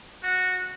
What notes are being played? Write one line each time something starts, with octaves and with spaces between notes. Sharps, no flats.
F#4